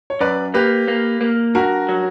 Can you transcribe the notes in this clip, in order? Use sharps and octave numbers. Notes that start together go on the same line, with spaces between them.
C#5
F#2 B4 D5
A#3 G4 B4
A#3
A#3
G2 F#4 A#4
F#3